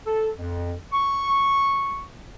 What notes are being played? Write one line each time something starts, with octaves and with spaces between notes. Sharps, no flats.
A4
F2
C#6